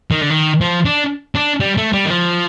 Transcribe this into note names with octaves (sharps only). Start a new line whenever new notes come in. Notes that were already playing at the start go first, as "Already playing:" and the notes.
D#3
D3
D#3
F3
D4
D4
G3
A3
G3
D#3
F3